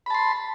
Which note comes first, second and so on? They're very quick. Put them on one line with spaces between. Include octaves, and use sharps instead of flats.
B5 A5 C6